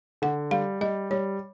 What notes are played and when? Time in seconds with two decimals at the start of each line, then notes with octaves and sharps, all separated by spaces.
0.22 D3 F#5
0.51 G3 F5
0.81 G3 D#5
1.11 G3 C#5